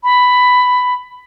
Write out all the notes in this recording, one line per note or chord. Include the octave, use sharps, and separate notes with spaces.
B5